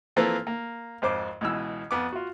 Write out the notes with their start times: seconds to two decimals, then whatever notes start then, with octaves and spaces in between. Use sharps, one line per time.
0.16 E3 F3 A#3 C4 A4 B4
0.47 A#3
1.02 G#1 F2 C5 D6
1.41 C#2 B2 E3 E6
1.91 F2 B3 D6
2.13 F4 F#4